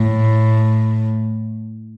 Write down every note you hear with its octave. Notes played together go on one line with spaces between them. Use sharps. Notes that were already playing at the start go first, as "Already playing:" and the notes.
Already playing: A2